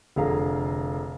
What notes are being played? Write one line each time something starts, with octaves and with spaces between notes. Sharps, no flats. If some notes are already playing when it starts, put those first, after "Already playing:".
F1 D3 G#4 F5 A#5